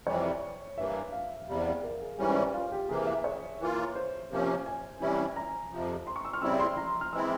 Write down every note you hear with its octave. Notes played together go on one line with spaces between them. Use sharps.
F2 C3 E3 G3 C#5
G2 E3 A#3 E5
F5
E2 C3 G3
A#4
G#4
G#2 E3 G3 C#4 G4
F4
G4
C3 E3 A#3 G#4
E5
C#5
E3 A#3 F4
C5
C3 F3 A#3 C#4
G#5
C3 E3 G3 C#4 E4
A#5
F2 C3 F3
C6
C#6
E6
F6
C#3 G3 C4 E4 E6
C6
A#5
F6
E3 G#3 C4 E4 E6